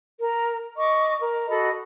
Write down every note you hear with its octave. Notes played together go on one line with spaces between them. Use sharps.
A#4
D#5 C#6 D6
A#4
F#4 A4 D#5 B5